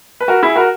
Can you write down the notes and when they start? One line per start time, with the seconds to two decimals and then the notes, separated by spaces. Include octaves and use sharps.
0.20 B4
0.28 F#4 A#4
0.43 E4 G#4
0.56 F#4 A#4